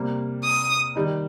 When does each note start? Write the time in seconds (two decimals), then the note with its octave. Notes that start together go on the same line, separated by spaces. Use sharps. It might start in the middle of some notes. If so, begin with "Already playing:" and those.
Already playing: C3 G3 A#3
0.44 D#6
0.95 D#3 G3 D#4